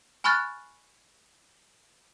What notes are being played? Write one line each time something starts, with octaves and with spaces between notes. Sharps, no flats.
G#5 B5 C#6 F6 F#6 A6